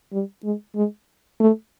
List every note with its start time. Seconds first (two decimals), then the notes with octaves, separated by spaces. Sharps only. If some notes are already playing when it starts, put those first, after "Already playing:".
0.13 G3
0.44 G#3
0.76 G#3
1.40 A3